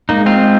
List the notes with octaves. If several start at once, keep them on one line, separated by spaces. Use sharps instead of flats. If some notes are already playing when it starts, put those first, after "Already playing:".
G#3 A#3 D#4
C4 F4